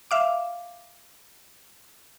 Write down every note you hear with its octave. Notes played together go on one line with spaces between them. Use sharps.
E5 F5 D6